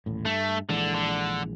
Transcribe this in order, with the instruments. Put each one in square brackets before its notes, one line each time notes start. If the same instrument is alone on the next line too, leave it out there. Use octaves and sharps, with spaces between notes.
[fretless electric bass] D#1 A1 A2
[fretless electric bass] G2 [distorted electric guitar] A3
[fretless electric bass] A#1 E3 G#3 [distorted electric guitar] D3
[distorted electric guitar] D3